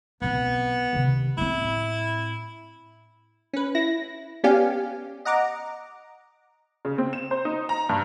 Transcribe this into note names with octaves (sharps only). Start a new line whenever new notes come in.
B1 B3 C4
C3 D#3
A2 C4 E4
C#4 B4
E4 A#6
B3 C#4 G4 D5 F5 G#5
D#5 F#5 A#5 D6
C#3
C4
E7
C5
D#4
A#5
G2